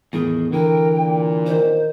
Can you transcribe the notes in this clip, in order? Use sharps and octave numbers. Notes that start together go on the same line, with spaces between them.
E2 A2 D#3 G#4
D3 E3 A#4 G5
A#2
D#3 C5